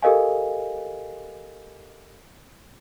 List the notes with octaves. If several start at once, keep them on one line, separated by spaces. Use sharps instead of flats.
G4 A4 A#4 D#5 F5 G#5